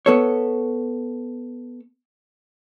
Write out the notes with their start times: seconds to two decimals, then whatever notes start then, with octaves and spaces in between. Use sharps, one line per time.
0.06 B3 A4 C#5